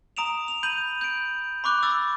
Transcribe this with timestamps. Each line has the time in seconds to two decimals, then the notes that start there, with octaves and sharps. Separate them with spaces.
0.17 A#5 D#6 D7 E7 F7
0.48 F7
0.63 B5 G6 D#7 F#7
1.01 G6 D7
1.64 B5 C#6 D6 F#6
1.83 D6 E6 A6